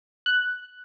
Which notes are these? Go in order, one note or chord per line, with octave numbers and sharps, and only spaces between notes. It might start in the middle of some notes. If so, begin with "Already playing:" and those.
F#6